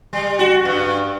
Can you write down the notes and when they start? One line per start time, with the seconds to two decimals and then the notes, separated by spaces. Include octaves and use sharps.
0.13 G3
0.39 F#4
0.65 G2